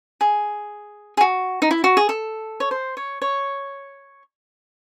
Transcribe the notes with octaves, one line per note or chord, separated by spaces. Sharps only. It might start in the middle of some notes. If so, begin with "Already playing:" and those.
G#4
G#4
F#4
D#4
E4
F#4
G#4
A4
C#5
C5
C#5
C#5